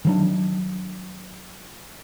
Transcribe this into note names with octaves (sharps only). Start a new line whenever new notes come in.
D#3 F#3 D4